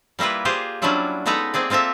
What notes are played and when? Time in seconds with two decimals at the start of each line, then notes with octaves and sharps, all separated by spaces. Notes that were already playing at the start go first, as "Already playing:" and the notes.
0.19 G3 A#3 E4 F4 B4
0.45 F4 G4 G#4 C5
0.82 F#3 G3 C#4 D4 E4 F4
1.26 G#3 B3 D#4 A4 B4 A#5
1.54 A#3 C4 G#4 D5
1.70 A#3 C4 F4 A4 E5